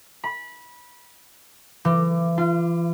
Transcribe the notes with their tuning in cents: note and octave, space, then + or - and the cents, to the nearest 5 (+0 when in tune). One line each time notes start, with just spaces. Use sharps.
B5 -20
E3 +35
F4 -30